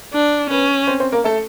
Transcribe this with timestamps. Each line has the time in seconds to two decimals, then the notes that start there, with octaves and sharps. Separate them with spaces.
0.13 D4
0.50 B3 C#4 B4
0.87 C4 C5
1.00 C4 C5
1.12 A#3 A#4
1.24 A3 A4